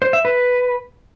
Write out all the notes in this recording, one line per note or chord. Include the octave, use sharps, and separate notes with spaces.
C5
E5
B4